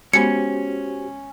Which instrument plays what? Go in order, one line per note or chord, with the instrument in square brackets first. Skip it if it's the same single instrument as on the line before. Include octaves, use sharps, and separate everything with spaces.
[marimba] G#3 B3 [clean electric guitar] C#4 [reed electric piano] F#4 G4 C5 [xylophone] C#7